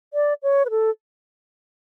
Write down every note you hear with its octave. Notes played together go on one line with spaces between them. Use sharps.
D5
C#5
B4
A4